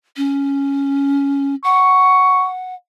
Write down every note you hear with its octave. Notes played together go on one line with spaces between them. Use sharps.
C#4
F#5 C#6